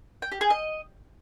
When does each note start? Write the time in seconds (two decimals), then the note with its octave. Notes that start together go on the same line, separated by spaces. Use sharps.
0.22 G5
0.32 G4
0.41 G#4
0.50 D#5